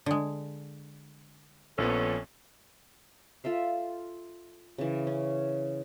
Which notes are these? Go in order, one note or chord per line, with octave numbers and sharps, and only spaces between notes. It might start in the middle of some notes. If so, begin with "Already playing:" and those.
D3 G#3
A#1 F3 B3 C#4 A4
F4 A4 E5 F5
C#3 E3
C#4